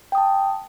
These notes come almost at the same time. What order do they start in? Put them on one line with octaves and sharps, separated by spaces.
G5 D#6 A5